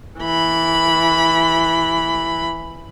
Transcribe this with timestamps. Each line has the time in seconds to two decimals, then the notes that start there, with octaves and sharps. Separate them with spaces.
0.20 E3 B5